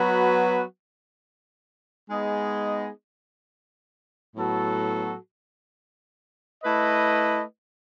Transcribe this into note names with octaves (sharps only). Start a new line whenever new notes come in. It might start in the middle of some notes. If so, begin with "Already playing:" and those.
Already playing: F#3 B3 F#4 B4
G#3 B3 D#4 G#4 D#5
A2 F#3 B3 F#4 A4
A3 E4 B4 D#5